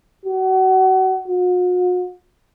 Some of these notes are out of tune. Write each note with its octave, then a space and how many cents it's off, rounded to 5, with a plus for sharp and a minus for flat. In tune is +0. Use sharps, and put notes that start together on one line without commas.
F#4 +30
F#4 -45